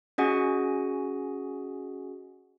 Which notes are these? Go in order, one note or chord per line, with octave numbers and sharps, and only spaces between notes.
C#4 F#4 G#4 D#5 F#5 G#5